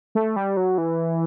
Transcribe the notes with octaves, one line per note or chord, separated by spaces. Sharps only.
A3
G3
F#3
E3